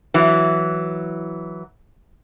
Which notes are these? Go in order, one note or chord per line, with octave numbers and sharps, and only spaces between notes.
E3 F#3